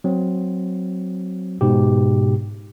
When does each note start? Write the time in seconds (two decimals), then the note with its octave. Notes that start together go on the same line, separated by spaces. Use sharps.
0.04 F#3 C4
1.61 G#2 B2 G4